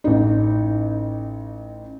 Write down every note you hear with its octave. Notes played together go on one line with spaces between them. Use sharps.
A1 D#4